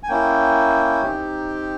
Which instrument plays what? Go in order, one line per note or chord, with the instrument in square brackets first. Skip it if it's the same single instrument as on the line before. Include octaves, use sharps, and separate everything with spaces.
[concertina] G#5
A#3 C#4 E4 G5
C4 D#4 G4